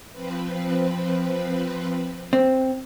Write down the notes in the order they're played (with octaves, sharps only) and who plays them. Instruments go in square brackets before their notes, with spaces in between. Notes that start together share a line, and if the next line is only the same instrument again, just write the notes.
[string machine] F3 C4 B4
[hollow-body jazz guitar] C4